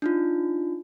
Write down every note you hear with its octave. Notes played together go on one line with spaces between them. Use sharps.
D4 D#4 F4